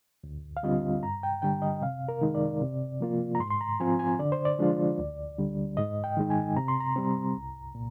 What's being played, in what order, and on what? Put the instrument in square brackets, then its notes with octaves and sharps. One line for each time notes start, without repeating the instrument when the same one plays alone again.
[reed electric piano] D2
F5
D3 G3 C4 F4 D#5
G2 A#5
G5
D3 G3 G5
D#5
C3 F5
A#4
D#3 G#3 D#4
D5
C3
F3 A#3 F4
A#5
G#2 C6
C6
A#5
F3 C4 F4 G#5
G#5
D3 D5
C5
D5
F3 G#3 D4 F4
D2
D3 G3
G#2 D#5
G5
D#3 G#3 D#4
G#5
C3 A#5
C6
A#5
G3 C4
C2
A#2